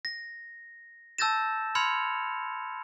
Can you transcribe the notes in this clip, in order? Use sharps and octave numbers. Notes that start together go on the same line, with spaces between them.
A#6
A5 E6 G6 A6 A#6 E7
B5 C6 F6 G#6 C#7 F7